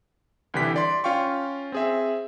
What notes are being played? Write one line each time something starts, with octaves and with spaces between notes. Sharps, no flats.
C2 D3 E3 G4 B6
D5 C6
C#4 F4 F5 G5 C#6
C4 G#4 E5